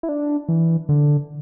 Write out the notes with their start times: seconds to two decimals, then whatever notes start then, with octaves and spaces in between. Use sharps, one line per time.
0.03 E4
0.09 D4
0.49 E3
0.89 D3